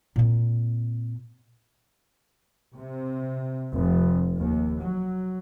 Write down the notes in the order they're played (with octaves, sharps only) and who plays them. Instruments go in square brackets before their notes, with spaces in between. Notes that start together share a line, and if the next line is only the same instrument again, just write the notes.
[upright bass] A#2 C4
[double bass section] C3
F1
D#2
F#3